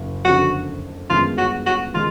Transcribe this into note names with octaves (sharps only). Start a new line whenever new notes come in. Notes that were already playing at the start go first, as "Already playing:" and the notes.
Already playing: F#1
F#1 F2 D3 F#4
G1 F#2 D#3 G#3 F4
F#4
F#4
D#3 G#3 F4